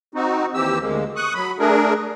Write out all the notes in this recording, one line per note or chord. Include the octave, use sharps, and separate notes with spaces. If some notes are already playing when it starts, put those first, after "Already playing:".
C4 D#4 F#4
D#2 E3 C4 G4 E6
D2 G#3 A#3
C#6 D#6 F#6
F#3 B5
A3 D4 G#4 A#4